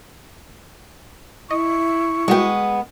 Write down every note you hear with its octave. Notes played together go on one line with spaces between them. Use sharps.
E4 D#5 C#6
G3 G#3 B3 F#4 G5